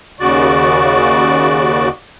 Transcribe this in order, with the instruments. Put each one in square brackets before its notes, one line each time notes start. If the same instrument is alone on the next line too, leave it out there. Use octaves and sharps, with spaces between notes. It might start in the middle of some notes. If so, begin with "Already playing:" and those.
[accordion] D#2 C#3 F#4 D5